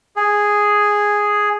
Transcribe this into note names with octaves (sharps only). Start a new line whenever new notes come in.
G#4